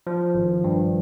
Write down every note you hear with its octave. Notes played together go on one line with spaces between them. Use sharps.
F3
G#1
G2